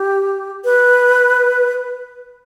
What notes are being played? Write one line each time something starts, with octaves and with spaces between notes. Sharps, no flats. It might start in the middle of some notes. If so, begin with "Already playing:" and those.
Already playing: G4
B4